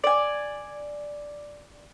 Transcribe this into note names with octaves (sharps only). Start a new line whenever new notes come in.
D5 G#5